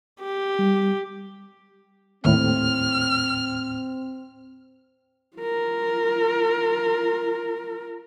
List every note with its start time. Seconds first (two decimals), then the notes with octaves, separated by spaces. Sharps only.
0.20 G4
0.59 G3
2.25 D#2 A2 C4 F6
5.37 F4 A#4